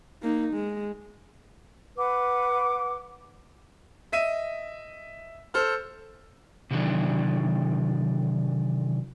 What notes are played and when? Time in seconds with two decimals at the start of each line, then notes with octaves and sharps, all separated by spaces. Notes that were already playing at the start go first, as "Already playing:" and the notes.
0.22 A#3 D#4
0.54 G#3
1.96 B4 F#5 D6
4.12 D#5 E5 D#7
5.54 A4 C5 F6
6.71 C3 D#3 E3 F#3 D4